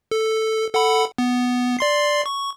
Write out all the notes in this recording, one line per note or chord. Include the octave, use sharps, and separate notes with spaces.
A4
A4 F#5 B5
B3
D5 C6 C7
C#6